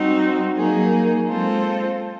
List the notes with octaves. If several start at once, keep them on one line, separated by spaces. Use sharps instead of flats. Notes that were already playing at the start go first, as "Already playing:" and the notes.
Already playing: G3 C4 D#4 F#4
F#3 A#3 D#4 G#4
G#3 C4 F4 A4 C5